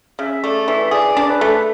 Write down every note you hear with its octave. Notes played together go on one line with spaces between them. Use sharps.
C#3 E5
A3 D5
E3 E5
E5
G#4 D5
D4
B4
A3